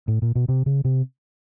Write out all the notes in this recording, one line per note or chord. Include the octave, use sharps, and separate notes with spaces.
A2
A#2
B2
C3
C#3
C3